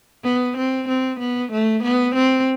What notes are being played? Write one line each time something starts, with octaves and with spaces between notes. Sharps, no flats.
B3
C4
C4
B3
A3
B3
C4